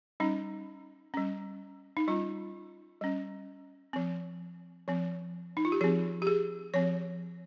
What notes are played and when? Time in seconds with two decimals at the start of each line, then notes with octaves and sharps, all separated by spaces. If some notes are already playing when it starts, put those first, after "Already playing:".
0.20 G3 C#4 D#4
1.14 G3 C#4
1.97 D#4
2.08 G3 C#4 F4
3.01 G3 C#4
3.93 F3 C4
4.88 F3 C4
5.57 D#4
5.65 F4
5.72 G4
5.81 F3 C4 G#4
6.22 G4
6.27 G#4
6.74 F3 C4 C#5